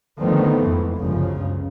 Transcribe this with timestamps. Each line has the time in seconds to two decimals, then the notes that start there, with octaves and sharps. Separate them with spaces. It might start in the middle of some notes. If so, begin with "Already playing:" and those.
0.19 D3 D#3 F3 A3 B3 C4
0.61 F2 G#2 E3
0.98 G1 C#2 F#2 C#3 F3